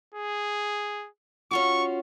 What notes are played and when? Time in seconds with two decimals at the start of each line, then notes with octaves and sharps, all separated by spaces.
0.14 G#4
1.51 C#4 F4 F#4 C#6